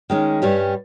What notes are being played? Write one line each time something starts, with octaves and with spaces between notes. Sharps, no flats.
D#3 G#3 C#4
G2 G3 C#4 G4